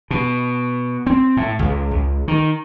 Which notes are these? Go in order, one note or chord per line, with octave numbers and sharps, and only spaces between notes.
B2
C4
A2
C#2
C#2
D#3